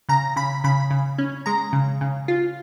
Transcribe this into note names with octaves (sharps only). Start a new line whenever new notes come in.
C#3 A#5
C#3 B5
C#3 B5
C#3
C#4
G#3 A#5
C#3
C#3
F4